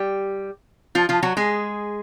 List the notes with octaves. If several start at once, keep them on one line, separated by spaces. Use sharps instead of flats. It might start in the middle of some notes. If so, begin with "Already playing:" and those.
Already playing: G3 G4
F3 F4
F3 F4
F#3 F#4
G#3 G#4